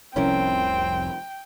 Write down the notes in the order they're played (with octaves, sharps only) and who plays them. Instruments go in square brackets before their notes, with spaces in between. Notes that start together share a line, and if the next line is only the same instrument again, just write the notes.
[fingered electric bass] F1 C2 F2 [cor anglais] C4 [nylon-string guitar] C#4 E4 A#4 [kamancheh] G5